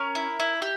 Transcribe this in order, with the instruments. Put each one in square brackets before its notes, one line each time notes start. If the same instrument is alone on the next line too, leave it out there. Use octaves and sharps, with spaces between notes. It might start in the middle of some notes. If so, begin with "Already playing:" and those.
Already playing: [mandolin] C#4 A#4
E4
E4
G4